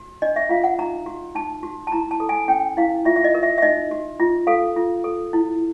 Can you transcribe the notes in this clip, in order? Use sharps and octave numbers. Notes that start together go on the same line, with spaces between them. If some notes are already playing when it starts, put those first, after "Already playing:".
Already playing: F#4
D4 D#5
E5
F4 F5
F#5
D#4 A#5
F#4
D#4 A5
F#4
A5
E4 A#5
A5
A4
G#5
C#4 G5
E4 F5
F4 E5
E5
D#5
A#4
E5
E5
D#4 D#5
F#4
F4
A4 F5
F4
A4
E4